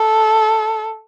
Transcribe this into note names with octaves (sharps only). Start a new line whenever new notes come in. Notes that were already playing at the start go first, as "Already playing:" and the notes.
Already playing: A4